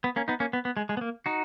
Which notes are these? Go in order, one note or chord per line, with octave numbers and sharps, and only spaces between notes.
B3
A#3 C#4
B3 D#4
A#3 C#4
B3
B3
G#3
G#3
B3
A#3
D#4 F#4